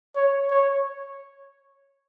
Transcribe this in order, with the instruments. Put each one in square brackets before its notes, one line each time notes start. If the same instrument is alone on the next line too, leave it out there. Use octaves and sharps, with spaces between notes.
[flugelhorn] C#5
C#5